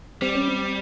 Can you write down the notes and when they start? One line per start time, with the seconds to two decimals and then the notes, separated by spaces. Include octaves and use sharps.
0.22 G3 C4
0.35 C#4
0.48 C4